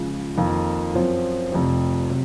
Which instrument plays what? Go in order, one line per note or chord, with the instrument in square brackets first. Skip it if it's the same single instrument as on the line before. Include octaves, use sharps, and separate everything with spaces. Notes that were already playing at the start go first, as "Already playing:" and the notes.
Already playing: [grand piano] C#2 C#3 F3
F2 D#3 A#3 F4
F#2 F3 C4
F1 F2 C3
C3 F#3